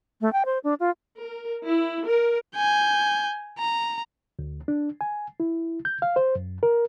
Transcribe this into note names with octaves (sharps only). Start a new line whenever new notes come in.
A3
G5
C5
D4
F4
A#4
E4
A#4
G#5 G6
A#5
D2
D4
G#5
E4
G6
F5
C5
F#2
A#4